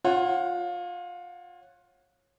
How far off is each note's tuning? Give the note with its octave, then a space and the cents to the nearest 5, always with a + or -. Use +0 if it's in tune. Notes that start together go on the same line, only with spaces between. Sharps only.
F4 +20 C#5 -25 F#5 +0